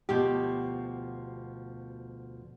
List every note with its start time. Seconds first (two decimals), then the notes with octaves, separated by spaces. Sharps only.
0.09 D2 B2 F3 G4